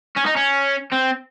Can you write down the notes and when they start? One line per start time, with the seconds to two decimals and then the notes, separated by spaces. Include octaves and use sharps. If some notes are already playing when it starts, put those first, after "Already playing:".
0.17 C#4
0.26 D#4
0.36 C#4
0.92 C4